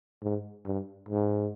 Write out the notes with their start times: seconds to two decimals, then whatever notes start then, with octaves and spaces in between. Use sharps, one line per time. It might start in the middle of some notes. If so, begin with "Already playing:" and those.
0.23 G#2
0.66 G2
1.09 G#2